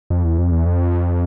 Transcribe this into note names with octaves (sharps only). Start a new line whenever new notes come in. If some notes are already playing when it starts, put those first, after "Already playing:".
F2
E2
F2
E2
F2